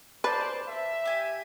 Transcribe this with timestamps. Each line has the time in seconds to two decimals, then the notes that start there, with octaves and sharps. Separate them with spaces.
0.24 B4 C5 D5 A5
0.67 E5
1.05 G4 G#5